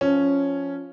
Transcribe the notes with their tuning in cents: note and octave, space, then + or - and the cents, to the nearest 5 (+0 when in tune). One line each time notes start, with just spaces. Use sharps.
F3 +0 C#4 +0